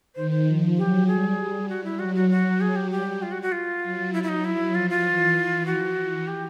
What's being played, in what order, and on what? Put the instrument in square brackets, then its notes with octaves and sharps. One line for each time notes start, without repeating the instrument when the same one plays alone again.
[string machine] D#3 [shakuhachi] C5
[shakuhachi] C5
[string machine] F3
[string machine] F#3 [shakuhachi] G4
[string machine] G3 [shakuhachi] G#4
[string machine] G3
[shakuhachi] F#4
E4
[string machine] F#3 [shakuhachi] F#4
[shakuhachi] F#4
F#4
G#4
G4
[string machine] G3 [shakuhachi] G4
[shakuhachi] F4
F#4
F#4
F4
[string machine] F#3
[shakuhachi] E4
E4
D#4
E4
[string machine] F3 [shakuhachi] F4
[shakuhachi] F4
[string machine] E3
[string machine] F3 [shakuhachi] F#4
[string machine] E3
[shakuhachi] G4